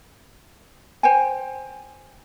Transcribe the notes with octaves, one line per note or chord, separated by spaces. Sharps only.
C5 G5 G#5